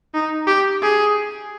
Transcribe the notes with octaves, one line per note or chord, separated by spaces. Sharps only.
D#4
G4
G#4